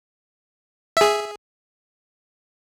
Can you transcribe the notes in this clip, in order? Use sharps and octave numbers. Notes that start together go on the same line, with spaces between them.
G#4 E5